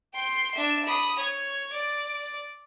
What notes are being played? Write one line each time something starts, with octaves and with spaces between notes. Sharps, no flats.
G5 C6
D4 E5
B5 D#6
C#5
D5